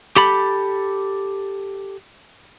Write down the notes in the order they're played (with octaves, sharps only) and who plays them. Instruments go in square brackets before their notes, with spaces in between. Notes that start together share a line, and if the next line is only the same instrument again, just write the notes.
[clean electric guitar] G4 A4 B5